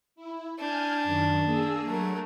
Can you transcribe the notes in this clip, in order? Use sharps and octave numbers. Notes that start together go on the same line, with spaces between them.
E4
D4 G#5 F6 G6
F#2 D#3
A#3 G#4 E6
F#3 A3 A#4